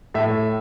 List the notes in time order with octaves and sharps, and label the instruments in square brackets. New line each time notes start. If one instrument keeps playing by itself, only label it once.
[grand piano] A2 E5